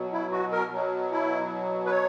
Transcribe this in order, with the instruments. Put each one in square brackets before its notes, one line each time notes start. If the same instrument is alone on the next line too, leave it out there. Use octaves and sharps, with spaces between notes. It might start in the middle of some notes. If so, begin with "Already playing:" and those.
Already playing: [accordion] B2 F#3
E4
F#4
A#4
B2 F#3
E4
B4
C#5